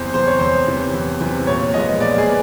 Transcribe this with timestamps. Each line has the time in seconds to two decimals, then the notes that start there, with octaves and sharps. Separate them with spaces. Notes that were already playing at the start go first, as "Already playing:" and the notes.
Already playing: E2 C3 E3 C5
0.14 C3 E3 C5
0.27 C#5
0.39 E2 C5
0.67 C3 E3
0.94 E2
1.21 C3 E3
1.47 A#2 C#5
1.74 F3 G#3 B3 D#5
2.00 A#2 D5
2.18 G#4
2.27 B3